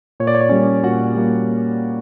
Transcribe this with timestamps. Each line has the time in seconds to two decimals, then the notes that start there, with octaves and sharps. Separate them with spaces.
0.20 A#2 C#5
0.27 D5
0.35 C#5
0.41 D5
0.49 G3 A#3 C#4 C#5
0.84 A#2 F#4 F#5
1.16 G3 A#3